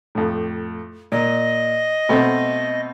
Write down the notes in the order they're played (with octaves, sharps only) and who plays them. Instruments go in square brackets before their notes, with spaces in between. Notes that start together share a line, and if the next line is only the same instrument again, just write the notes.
[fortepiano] F2 A2
[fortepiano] A#2 [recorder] D#5
[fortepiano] B2 A3 C4